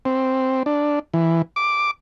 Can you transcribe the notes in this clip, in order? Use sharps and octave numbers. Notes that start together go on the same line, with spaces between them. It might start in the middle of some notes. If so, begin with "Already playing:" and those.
C4
D4
E3
D6